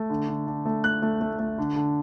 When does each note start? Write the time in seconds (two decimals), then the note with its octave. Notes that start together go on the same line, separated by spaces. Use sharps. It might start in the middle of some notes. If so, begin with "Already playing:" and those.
Already playing: A3
0.10 D3
0.28 D3
0.47 D3
0.66 A3
0.84 A3 F#6
1.02 A3
1.21 A3
1.39 A3
1.58 D3
1.76 D3